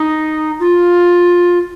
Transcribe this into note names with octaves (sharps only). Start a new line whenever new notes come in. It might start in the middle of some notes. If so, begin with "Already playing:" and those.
Already playing: D#4
F4